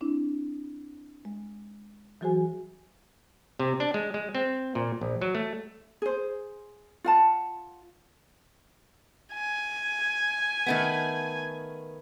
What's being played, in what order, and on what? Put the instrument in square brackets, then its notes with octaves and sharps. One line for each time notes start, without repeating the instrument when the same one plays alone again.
[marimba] C4 D4 E4
G#3
E3 F#3 F#4 G#4 C5 G#5
[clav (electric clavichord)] C3
D4
G#3
G#3
C4
A#2
A#1
F#3
A3
[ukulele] G#4 C5
F4 F#5 A5
[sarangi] G#5
[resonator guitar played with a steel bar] D#3 A3 B3